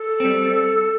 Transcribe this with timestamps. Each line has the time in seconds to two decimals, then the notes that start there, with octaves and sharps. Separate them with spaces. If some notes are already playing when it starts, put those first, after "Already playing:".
Already playing: A4
0.20 G3 C4